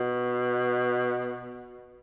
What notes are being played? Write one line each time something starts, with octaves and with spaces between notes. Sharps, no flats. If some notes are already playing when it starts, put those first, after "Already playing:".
Already playing: B2